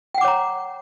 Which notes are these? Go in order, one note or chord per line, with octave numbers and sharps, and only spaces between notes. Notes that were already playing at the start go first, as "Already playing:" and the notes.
C#5 F#5 G5 A#5 D6